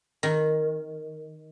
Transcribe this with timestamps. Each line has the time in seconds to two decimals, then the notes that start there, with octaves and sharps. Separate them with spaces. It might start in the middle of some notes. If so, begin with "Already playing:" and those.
0.23 D#3